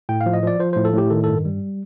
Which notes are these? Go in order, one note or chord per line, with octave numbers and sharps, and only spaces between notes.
A2 G5
F5
F3
D#5
F3 D5
F3 C5
A2 C5
A4
A2 G4
D#3 A4
G2 A4
G3